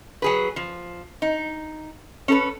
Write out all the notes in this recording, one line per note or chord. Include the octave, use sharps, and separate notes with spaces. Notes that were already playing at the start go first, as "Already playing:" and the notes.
F#3 G#4 B4
F3
D#4
C#4 A4 B4